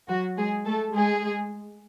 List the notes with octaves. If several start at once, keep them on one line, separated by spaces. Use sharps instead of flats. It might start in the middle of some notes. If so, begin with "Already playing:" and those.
F#3 F#4
G#3 G#4
A3 A4
G#3 G#4